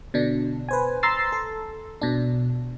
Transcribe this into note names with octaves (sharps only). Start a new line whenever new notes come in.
B2 D3 D4
B4 C5 G#5
A#5 C6 E6 A6 C7
A4
B2 D4